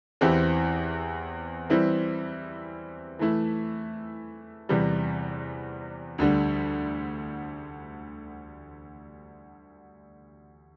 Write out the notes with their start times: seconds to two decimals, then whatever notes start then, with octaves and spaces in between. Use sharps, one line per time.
0.21 E2 E3 C4 E4 G4
1.70 E3 G3 C4 E4
3.19 E3 A3 E4
4.69 E2 C3 E3 G3
6.18 D2 D3 G3